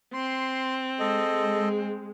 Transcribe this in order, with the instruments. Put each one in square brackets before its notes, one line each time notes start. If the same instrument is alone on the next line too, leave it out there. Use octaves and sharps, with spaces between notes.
[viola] C4 [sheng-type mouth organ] C6
[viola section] G#3 [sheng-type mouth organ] A4 D#5